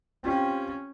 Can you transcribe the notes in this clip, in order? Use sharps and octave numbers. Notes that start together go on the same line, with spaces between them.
C4 C#4 F4 G4